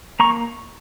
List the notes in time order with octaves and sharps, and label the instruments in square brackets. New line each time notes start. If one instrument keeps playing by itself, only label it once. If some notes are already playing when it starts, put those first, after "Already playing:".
[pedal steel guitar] A#3 A#5 C#6